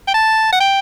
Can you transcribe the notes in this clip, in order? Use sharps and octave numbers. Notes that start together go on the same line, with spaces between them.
G5
A5
F#5
G5